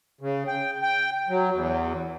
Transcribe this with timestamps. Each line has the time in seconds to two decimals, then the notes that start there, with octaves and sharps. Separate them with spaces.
0.21 C#3
0.47 G5
0.82 G5
1.29 F#3
1.53 E2